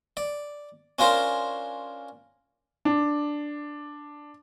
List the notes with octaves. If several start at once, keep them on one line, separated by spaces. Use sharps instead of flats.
D5
C#4 D4 F4 A#4 C5
D4